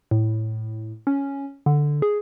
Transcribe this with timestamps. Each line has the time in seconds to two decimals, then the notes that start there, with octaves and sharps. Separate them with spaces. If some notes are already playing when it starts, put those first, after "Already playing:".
0.11 A2
1.07 C#4
1.66 D3
2.02 G#4